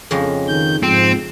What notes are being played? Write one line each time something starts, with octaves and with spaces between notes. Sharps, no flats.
F2 C#3 G#3
D#3 G6
G#2 F3 C4